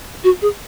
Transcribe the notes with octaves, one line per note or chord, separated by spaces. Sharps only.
F#4
G#4